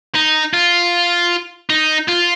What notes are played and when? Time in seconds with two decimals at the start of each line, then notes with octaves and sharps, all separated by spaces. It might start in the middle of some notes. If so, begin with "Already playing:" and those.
0.15 D#4
0.54 F4
1.70 D#4
2.09 F4